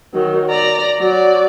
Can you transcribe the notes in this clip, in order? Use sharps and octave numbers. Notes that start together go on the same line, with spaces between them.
D#3 F#3
D5 A#5
F#3 D5